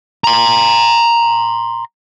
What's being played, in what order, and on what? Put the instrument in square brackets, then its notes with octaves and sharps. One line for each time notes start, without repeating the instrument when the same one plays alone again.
[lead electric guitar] A#5 C6